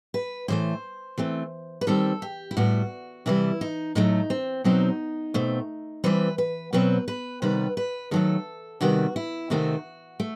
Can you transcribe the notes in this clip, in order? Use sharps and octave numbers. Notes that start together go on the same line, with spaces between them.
B4
A2 E3 A3 C5
E3 A3 C4
B4
D#3 G3 C4 A4
G4
E4
A2 G3 B3 F#4
C3 E3 G3 E4
D#4
A2 F#3 A3 D#4
C4
B2 F#3 C4 D#4
B2 A3 C4
E3 G3 C4 B4
B4
B2 F#3 C4 B4
B4
C3 D#3 G3 B3 B4
B4
D#3 F#3 A3 A4
C3 D#3 G3 B3 F#4
E4
C3 D#3 A3 C4 F#4
A3